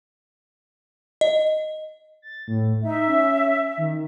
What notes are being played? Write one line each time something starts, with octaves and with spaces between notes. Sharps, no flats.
D#5
A6
A2
D#4 E5
C#4
D#3